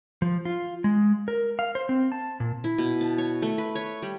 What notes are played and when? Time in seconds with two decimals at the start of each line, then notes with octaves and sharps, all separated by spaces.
0.22 F3
0.45 F4
0.84 G#3
1.28 A#4
1.59 F5
1.75 C5
1.89 C4
2.12 A5
2.40 A#2
2.64 E4
2.78 B2
3.01 A5
3.18 C#5
3.42 A3
3.58 B4
3.75 C#5
4.02 G3